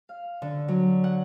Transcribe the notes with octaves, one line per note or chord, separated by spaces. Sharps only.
F5
D3
F#3
F#5